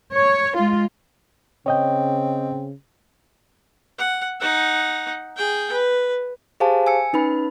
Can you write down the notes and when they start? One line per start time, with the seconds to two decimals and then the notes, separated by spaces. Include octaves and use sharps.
0.14 C#5
0.57 G#3 F4
1.66 C#3 C4 C#5 D#5 G5
3.99 F#5
4.40 D#4 F#5
5.36 G#4 G5
5.72 B4
6.60 G4 G#4 C5 F5 G#5 A5
6.87 G#5 E6 C#7
7.13 C#4 D#4 B4 B5